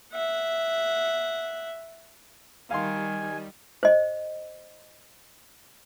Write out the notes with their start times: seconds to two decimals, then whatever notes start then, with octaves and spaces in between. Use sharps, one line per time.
0.13 E5 F#5
2.71 D#3 G3 F5 G#5 C6
3.83 C5 D#5